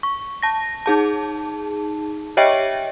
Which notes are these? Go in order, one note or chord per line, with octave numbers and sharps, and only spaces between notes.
C#6
A5 A#6
D#4 G#4 A5
G4 C#5 D#5 E5 G5